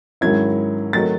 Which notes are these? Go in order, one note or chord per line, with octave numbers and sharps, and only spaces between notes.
G#2 D#3 F#3 C#4 E4 G#6
D#3 F#3 A3 D#4 A6